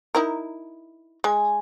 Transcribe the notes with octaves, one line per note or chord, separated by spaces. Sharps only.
D#4 E4 A#4
G#3 G#5